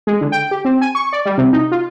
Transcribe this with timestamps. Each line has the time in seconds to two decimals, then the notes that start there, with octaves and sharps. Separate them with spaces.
0.07 G#3
0.21 D3
0.32 G5
0.51 G4
0.65 C4
0.81 G#5
0.95 C#6
1.13 D5
1.25 G3
1.38 C3
1.53 D#4
1.72 F4